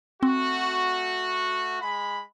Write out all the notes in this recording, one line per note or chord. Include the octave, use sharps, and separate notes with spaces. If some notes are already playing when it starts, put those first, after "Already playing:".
A3 C4 F#4
G#3 B5